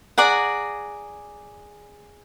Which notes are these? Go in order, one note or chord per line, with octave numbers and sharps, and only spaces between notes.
G#4 D5 F#5 A#5